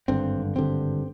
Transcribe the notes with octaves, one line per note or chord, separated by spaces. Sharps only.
G#1 G2 D3 C4
G#1 G2 D3 C4